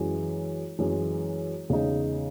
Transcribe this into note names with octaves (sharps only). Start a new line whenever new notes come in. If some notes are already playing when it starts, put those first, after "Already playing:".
Already playing: F#2 E3 G#3
F#2 E3 G#3
E2 C#3 G#3 D#4